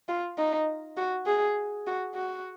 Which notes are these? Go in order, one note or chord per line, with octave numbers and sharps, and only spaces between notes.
F4
D#4
F#4
G#4
F#4
F#4